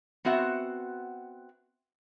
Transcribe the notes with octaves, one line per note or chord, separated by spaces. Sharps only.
B3 C4 F#4 E5 F#5